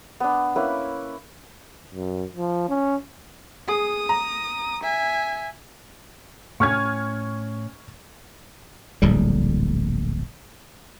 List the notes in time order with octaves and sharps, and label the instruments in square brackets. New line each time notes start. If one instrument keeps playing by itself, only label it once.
[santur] B3 D4
A#3 C#4 E4 B4
[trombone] F#2
F3
C#4
[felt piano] G#4 [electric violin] D#6
[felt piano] A#5
[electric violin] E5 G#5
[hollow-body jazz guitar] A2 C#4 [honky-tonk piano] C#6 F6 G#6
[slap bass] D1 A#1 A2 G3